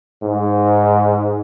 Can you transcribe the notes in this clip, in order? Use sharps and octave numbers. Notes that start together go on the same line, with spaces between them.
G#2